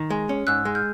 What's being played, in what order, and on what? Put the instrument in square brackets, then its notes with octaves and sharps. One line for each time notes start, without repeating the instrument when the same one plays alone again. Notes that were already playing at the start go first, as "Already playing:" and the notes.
Already playing: [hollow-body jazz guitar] D#3
G#3
C#4
[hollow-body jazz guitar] G#2 [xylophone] E6 F#6
[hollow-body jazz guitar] G#3
[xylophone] F6 G6